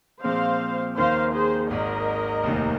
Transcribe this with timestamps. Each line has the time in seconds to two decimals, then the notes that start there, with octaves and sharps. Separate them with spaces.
0.24 A#2 F3 G#3 C4 C5 F5
0.97 D#2 D#3 A#3 C5 F5
1.34 G#4 C5
1.70 G#1 G#2 G#3 A#4 D#5
2.44 F1 D#2 D#3